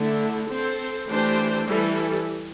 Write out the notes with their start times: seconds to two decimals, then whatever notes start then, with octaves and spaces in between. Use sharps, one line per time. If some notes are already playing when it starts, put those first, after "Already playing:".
Already playing: D3 A3 E4
0.50 C4 A4 C5
1.09 E3 A3 D4 G4 C5
1.67 E3 G3 E4 A4